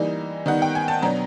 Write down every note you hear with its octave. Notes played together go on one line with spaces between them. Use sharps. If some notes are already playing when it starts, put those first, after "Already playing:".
Already playing: E3 G3 A#3 D#4
D#3 G3 B3 D#4 F#5
G5
G#5
A5
B2 F#3 B3 D4 A#5